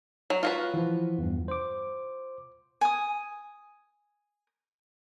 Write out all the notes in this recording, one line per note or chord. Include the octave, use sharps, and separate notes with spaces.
F#3
F4 F#4 B4
E3 F3
E2 G2
C5 D6
G#5 D#6